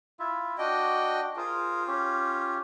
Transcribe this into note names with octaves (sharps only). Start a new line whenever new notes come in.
E4 F4 E5
D4 F#4 D#5 G5
F4 G#4 A#4 C5
C#4 G4